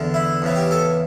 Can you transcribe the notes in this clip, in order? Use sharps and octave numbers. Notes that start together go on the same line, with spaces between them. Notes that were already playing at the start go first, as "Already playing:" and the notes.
Already playing: E2 D3
E4
E2 C#3 E3
G4
A4